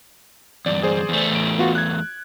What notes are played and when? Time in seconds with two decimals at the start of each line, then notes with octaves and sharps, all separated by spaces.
0.66 E2 G2 D5
0.83 G#4 C5 D5
1.09 E2 A3
1.31 A1 D7
1.58 B3 F4 F#4
1.75 F#6 G#6